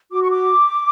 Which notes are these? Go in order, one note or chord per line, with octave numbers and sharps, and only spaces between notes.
F#4 D6
C#6
D6